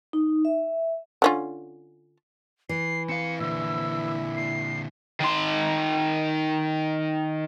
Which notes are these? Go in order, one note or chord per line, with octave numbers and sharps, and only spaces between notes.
D#4
E5
D3 C#4 F4
E3 C7
C4 F5 C#7
A#2 D3 E4 E6
C7
D#3 C6